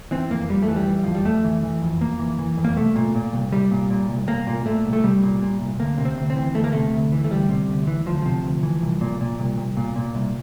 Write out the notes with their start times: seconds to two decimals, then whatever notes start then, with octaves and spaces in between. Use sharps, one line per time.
0.11 E3 C4
0.30 F2 A#3
0.49 F2 G3
0.63 A3
0.68 E3
0.76 G3
0.87 E3
1.04 F2 F3
1.15 G3
1.25 F2 A3
1.44 E3
1.63 E3
1.82 F2
2.01 F2 A#3
2.19 E3
2.39 E3
2.57 F2
2.64 A#3
2.76 C2 A3
2.96 A#2
3.15 A#2
3.33 C2
3.52 C2 G3
3.71 A#2
3.90 A#2
4.09 C2
4.28 C2 A#3
4.47 A#2
4.66 A#2 A3
4.85 C2
4.93 A3
5.03 C2 G3
5.23 A#2
5.41 A#2
5.61 C2
5.79 D2 A#3
5.98 C3
6.05 C4
6.18 D2
6.30 C4
6.36 E3
6.55 D2 A3
6.64 A#3
6.72 C3 A3
6.93 D2
7.12 E3
7.24 A3
7.31 D2 G3
7.49 C3
7.68 D2
7.87 E3
8.06 D2 F3
8.22 C3 F3
8.44 D2
8.63 E3
8.82 C2
9.01 A#2
9.20 A#2
9.39 C2
9.58 C2
9.77 A#2
9.96 A#2
10.15 C2